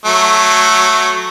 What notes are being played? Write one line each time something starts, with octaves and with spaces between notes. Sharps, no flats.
F#3 A3